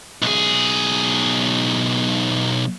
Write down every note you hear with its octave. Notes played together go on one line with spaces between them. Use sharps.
B1 G#4